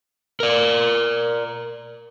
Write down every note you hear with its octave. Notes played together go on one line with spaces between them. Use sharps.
A#4 D5